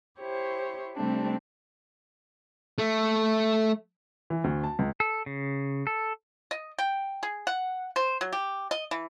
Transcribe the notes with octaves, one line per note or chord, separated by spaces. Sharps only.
E4 G4 C5 C#5
C3 G3 A3 C4 D4
A3
E3
D2
A5
C#2
A4
C#3
A4
D#5
G5
G#4
F#5
C5
F#3
G4
D#5
E3